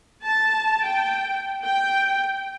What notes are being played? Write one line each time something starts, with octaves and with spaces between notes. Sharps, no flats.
A5
G5
G5